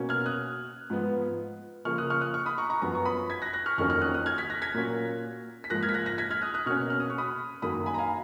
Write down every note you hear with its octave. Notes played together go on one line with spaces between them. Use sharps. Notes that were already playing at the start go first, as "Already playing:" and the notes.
Already playing: B2 A#3 C#4
F6 G#6
D#6 F#6
G#2 F3 B3
C#3 F3 A#3 C#6 F6
D#6 F#6
C#6 F6
D#6 F#6
C#6 F6
B5 D#6
A#5 C#6
A#5 C#6
F#2 F3 B3 A#5 C#6
C#6
B5 D#6
G#6 B6
F#6 A#6
F#6 A#6
C#6 F6
F2 D#3 F#3 A#3 C#4 C#6 F6
C#6 F6
D#6 F#6
D#6 F#6
F6 G#6
G#6 B6
F#6 A#6
G#6 B6
A#2 F#3 A#3 C#4
B6
G#2 F3 A#3 F#6 A#6
F6 G#6
B6
F#6 A#6
F#6 A#6
G#6 B6
F6 G#6
D#6 F#6
D#6 F#6
B2 A#3 C#4 C#6 F6
F6
D#6
C#6
B5 D#6
F#2 D#3 F#3 A#3 B5 D#6
G#5 B5
A#5
F5 G#5